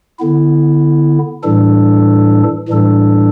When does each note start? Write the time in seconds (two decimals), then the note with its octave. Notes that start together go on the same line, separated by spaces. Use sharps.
0.19 D3 B3 E4
1.43 A2 E3 G3 D4 A4
2.68 A2 E3 G3 D4 A4